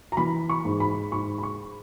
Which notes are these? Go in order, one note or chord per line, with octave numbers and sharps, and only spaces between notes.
A#5
E3 B5
C#6
G#2
B5
G#2 C#6
B5
C#6